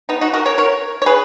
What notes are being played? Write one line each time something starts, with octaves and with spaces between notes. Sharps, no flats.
B3 D#4
D#4 F#4
F#4 A#4
A#4 C#5
A#4 C#5
C#5
G#4 B4